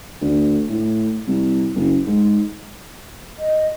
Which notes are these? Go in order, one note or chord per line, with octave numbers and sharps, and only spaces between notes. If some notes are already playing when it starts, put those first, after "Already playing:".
D2
A2
C2
F#1
G#2
D#5